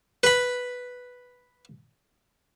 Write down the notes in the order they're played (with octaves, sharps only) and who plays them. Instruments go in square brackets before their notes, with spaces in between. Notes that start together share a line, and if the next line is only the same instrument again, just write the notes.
[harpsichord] B4 B5